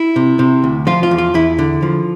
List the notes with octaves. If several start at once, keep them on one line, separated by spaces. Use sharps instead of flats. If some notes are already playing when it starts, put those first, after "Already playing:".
Already playing: E4
C3
C3
D2
F3 F4
F4
E2
F4
E2 E4
D3
F3